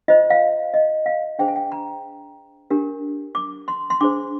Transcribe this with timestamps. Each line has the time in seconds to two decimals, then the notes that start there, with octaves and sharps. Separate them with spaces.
0.08 F4 C5 D#5
0.30 F5
0.74 D#5
1.06 F5
1.39 D4 G#4 C5 G5
1.48 G#5
1.56 G5
1.72 A#5
2.70 D4 G4 A#4
3.35 D6
3.68 C6
3.90 C6
4.01 D4 G#4 C5 D6